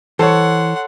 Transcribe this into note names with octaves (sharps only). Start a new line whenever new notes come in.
E3 A4 C5 C#5 F#5 C6